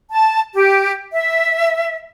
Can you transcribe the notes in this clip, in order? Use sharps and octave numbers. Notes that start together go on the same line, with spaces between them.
A5
G4
E5